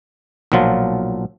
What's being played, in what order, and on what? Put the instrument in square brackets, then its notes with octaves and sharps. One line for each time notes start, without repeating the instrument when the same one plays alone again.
[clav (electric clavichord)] B1 A#2 F3 F#3 F4